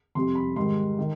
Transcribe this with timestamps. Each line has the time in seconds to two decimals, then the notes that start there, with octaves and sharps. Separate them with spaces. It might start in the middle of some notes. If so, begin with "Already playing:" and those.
0.15 F2 C3 G3 C6
0.35 B5
0.56 G#2 D#3 G3 C6
0.99 D#3